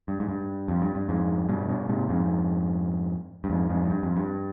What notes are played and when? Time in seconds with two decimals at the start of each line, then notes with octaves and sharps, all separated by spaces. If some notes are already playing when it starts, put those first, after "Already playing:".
0.08 G2
0.20 G#2
0.29 G2
0.68 F2
0.82 G2
0.95 G2
1.09 F2 G#2
1.49 G2 B2
1.69 G2 B2
1.89 G#2 C3
2.09 F2 G#2
3.44 G2
3.50 F2 G#2
3.69 F2 G#2
3.84 G#2
3.90 G2
4.03 F2
4.17 G2